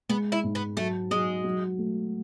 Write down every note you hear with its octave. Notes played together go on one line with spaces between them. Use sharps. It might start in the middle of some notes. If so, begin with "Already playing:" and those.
G#3 B3
E4
G#2
B3
F#3 A3
F#3 G#3
F#3
A3